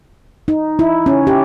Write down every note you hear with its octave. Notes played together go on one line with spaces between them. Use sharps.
D#4
E4
C#4
G4